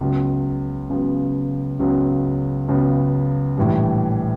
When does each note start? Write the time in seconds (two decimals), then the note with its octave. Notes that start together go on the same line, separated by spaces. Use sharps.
0.01 C#2 C#3 F#3 B3
0.90 C#2 C#3 F#3 B3
1.79 C#2 C#3 F#3 B3
2.68 C#2 C#3 F#3 B3
3.57 A#1 A2 E3 G3